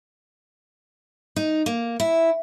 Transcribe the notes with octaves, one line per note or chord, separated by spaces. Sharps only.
D#4
A#3
E4